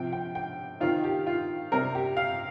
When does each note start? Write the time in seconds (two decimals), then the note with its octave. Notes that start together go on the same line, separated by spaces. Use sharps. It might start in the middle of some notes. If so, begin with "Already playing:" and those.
Already playing: C3 F3 C4 G5
0.13 G5
0.35 G5
0.80 D#3 C4 D#4 F4
1.04 G4
1.27 F4
1.72 C3 G3 C4 A#4
1.95 G4
2.17 F5